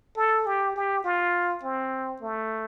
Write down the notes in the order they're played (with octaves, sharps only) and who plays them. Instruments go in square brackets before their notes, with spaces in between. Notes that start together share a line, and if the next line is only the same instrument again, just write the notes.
[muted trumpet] A4
G4
G4
F4
C4
A3